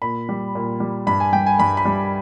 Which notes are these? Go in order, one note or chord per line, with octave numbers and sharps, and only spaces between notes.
A#2 B5
G3
A#2
G3
G2 B5
G#5
G3 G5
G#5
G2 B5
B5
G3